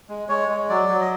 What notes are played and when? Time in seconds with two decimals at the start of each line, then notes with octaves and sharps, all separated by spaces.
0.09 G#3
0.29 G#3 C#5
0.49 G#3
0.69 F#3 D5
0.89 F#3
1.01 D#5